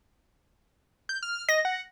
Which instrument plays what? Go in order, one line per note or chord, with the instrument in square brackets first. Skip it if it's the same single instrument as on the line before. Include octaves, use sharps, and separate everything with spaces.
[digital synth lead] G6
F6
[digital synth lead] D#5 [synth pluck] A#6
[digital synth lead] F#5